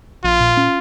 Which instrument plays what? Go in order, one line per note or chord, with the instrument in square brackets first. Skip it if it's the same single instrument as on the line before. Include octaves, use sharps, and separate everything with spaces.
[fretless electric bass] A#1 [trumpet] F4
[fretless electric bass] A#2
C#4